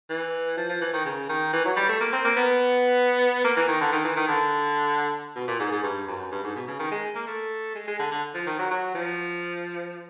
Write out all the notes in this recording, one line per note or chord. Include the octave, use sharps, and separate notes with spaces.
E3
F3
F3
E3
D#3
C#3
D#3
E3
F#3
G3
A3
A#3
C4
A#3
B3
A#3
E3
D#3
D3
D#3
E3
D#3
D3
B2
A#2
G#2
G#2
G2
F#2
G2
G#2
B2
C#3
D#3
G#3
A#3
A3
G#3
G#3
D3
D3
F3
D#3
F#3
F#3
F3